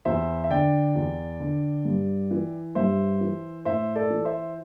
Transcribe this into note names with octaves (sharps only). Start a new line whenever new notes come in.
E2 C5 E5
E5
D3 D5 G5
E2
D3
G2
E3
G2 C5 E5
E3
A2 C5 E5
A4 D5
E3
C5 E5